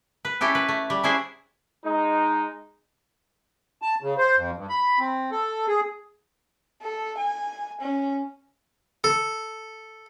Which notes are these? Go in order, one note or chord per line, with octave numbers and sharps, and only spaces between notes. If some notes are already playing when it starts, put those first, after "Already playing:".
B4
C#4 E4 G4 A4
B4
A3
G3
C#4 D4 E4 G#4 C5
G#3 D#4
A5
C#3
C5
F2
G2
B5
C4
A4
G#4
A4
G#5
C#4
A4